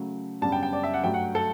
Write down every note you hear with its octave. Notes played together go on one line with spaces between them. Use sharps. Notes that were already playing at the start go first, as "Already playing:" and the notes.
Already playing: C#3 F#3 A3
F#2 C#3 G3 B3 D4 A5
G5
G5
D5
E5
F#5
G2 F#3 A3 G5
F#5
A4